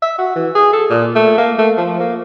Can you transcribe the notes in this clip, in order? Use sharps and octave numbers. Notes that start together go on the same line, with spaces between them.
E5
F#4
E3
G#4
A4
A#2
A3
A#3
A3
F3
A#3